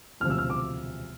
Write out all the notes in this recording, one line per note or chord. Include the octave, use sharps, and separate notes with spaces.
E1 D2 C3 F3 F6
E6
F6
D6